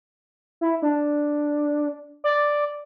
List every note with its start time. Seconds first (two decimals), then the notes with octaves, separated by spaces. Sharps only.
0.61 E4
0.82 D4
2.24 D5